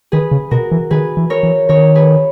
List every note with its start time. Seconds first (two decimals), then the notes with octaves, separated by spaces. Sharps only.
0.12 D#3 G#4 B4
0.31 C#3
0.51 B2 F#4 A#4
0.71 E3
0.91 D#3 G#4 B4
1.17 E3
1.30 A#4 C#5
1.43 E3
1.69 D#3 A#4 C#5
1.95 G#4 B4